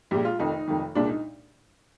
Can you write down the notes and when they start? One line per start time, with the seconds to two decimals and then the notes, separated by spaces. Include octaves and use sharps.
0.11 A#1 A#2 G#3 G4
0.25 F4
0.39 F1 F2 D#3 D#4
0.68 F1 F2 D#3
0.95 C2 A#2 G#3 D4
1.09 D#4